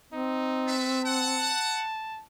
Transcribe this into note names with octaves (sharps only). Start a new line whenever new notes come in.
C4 D#4
A4 B4 E5
F#5 A5